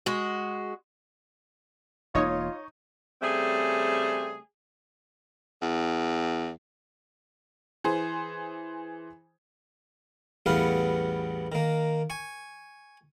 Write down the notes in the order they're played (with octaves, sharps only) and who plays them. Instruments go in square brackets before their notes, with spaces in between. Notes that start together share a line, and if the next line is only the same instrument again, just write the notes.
[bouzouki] G#3 F#4
[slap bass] E1 E3 A#3 [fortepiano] D#4 D#5 D#6 [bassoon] F4 [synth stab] C#5
[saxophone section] C#3 G3 A3 C4 G#4
[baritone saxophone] E2
[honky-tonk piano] E3 G#4 C5
[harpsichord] A1 E2 G3 B3 F5 F#5
D#3 A#3
G#5 C#6